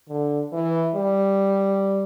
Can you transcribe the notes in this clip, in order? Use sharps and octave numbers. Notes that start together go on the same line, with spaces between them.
D3
E3
G3